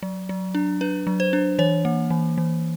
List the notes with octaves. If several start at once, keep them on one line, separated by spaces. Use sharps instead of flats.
F#3
F#3
D4
D4 B4
F#3
C5
D4
E3 C#5
A#3
E3
E3